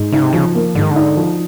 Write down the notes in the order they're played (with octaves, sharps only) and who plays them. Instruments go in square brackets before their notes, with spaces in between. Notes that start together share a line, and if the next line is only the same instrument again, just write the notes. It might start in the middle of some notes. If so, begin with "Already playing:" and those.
Already playing: [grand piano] G#2
[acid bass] C#3 [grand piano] D#4
[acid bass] C3
[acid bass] C#3 [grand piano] F3
[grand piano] A#3
[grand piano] G#2 [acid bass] D3
[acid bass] D#3
D3
[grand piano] D#4
F3